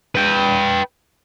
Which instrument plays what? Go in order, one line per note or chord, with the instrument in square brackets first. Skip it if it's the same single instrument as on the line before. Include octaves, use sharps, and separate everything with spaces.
[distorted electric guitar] B4 G5